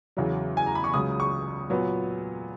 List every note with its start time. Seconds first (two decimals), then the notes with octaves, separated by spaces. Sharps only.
0.17 E2 C#3 F#3
0.57 G#5
0.66 A#5
0.75 B5
0.84 C#6
0.94 C#2 C#3 F#3 D#6
1.20 C#6
1.70 A#2 F#3 B3